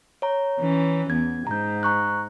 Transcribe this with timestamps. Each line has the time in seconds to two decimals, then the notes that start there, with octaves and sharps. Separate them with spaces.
0.22 C#5 A#5
0.59 E3 C#4
1.10 E2 G#6
1.47 G#2 A#5 G6
1.83 A#5 C#6 F#6